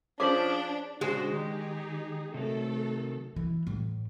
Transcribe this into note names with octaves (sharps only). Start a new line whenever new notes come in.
F3 C#4 D4 G#4 C5 D6 B6 F#7
C#3 G#3 D4 F#4 C5
D#3 D#4 G4 G#4
C3 D#3 F#3 A3 A4
E3
A2